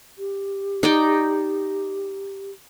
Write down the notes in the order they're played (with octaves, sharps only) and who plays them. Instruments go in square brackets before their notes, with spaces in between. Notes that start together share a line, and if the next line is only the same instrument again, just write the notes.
[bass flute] G4
[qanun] D#4 D5 G5